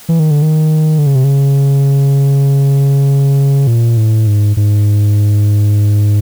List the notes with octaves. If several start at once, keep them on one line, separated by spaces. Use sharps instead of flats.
E3
D#3
D3
D#3
D3
C#3
C3
C#3
A#2
A2
G#2
G#2